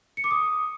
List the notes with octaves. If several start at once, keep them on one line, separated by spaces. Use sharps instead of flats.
C#7
D6
D#6